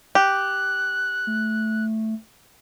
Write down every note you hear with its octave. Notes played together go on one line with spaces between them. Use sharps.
G4 F#6
A3